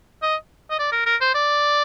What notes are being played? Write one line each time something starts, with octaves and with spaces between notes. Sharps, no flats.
D#5
D#5
D5
A#4
A#4
C5
D5